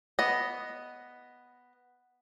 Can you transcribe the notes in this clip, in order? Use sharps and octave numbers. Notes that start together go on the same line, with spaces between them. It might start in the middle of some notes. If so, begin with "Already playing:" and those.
B3 D#5